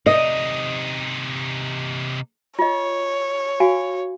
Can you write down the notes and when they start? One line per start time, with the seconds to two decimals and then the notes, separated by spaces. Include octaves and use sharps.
0.06 C3 D#4 D#5
2.59 F4 C#5 D#5
3.60 F#4 F5 G#5